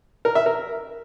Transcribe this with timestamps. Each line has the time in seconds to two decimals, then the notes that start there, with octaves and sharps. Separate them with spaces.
0.25 A#4
0.35 E5
0.46 A#4